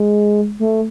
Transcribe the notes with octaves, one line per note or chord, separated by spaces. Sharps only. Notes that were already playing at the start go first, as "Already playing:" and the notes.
Already playing: G#3
A3